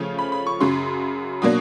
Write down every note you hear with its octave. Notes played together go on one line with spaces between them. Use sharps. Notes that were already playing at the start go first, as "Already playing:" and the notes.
Already playing: C#3 F3 A3 C#4 F4
B5
B5
C#6
F#2 C#3 F#3 C6
B2 F#3 A#3 D4 D#6